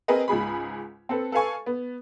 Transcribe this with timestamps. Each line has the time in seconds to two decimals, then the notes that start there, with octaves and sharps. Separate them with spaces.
0.08 C4 G#4 A#4 B4 D#5
0.28 C#2 G#2 G#4 B5
1.09 C4 A4 B4
1.32 A4 B4 F5 G#5 C#6
1.66 B3